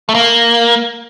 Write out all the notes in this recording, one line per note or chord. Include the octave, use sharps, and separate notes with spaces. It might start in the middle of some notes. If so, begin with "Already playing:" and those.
A3
A#3